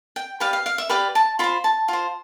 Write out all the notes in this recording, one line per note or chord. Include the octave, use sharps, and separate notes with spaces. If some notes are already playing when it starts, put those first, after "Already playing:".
G5
G4 B4 D5 F5
F5
F5
E5
G4 B4 D5 F5
A5
F4 C5 B5
A5
F4 C5